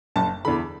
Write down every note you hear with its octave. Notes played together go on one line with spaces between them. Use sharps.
F#1 A5
E2 D3 B5